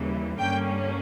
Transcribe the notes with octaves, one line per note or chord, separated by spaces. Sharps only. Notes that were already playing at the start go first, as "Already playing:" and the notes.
Already playing: D#2 C#3 E3 G3
G2 D3 G3 A#3 C#4 G5